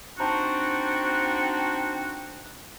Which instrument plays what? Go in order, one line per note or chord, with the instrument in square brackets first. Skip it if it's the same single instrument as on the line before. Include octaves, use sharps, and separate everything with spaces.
[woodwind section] C4 D4 D#4 F#4